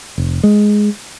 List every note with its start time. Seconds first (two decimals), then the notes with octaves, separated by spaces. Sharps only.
0.18 F1
0.43 G#3